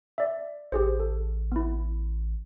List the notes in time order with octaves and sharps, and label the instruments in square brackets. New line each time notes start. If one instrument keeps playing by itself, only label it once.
[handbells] D5 E5
[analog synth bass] A1 [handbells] G4 G#4 C5
[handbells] A4
B3 E4